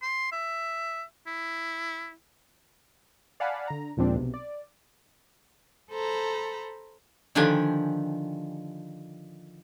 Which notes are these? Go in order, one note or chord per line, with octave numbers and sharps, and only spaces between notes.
C6
E5
E4
D5 F5 F#5 G#5 A5 B5
D3 A#5
D#2 A#2 F3 G#3 C4 D4
B1 C3
D5
A4 C5 A#5 B5
D3 D#3 F3 D4 G4 G#5